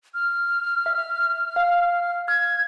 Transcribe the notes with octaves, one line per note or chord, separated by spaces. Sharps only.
F6
E5
F5
F6 G#6